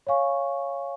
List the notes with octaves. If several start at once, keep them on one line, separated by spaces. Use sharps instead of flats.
C#5 F5 G#5 C#6